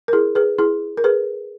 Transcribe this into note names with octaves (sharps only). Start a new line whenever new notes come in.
A#4
E4 G#4
G#4 B4
E4 G#4
A#4
G#4 B4